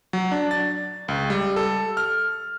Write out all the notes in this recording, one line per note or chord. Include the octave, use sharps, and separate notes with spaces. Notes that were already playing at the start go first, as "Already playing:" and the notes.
F#3
D4
A6
C#2
G3
A4
F6